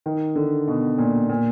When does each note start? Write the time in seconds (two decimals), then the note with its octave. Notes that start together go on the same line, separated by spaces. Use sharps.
0.06 D#3
0.36 D3
0.68 B2
0.98 A#2
1.29 A#2